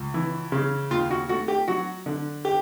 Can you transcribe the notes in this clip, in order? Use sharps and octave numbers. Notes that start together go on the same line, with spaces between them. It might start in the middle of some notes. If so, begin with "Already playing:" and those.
Already playing: C#2
E3
C#3
D#2 F4
F#4
A3 F#4
G4
F#3 F#4
D3
G4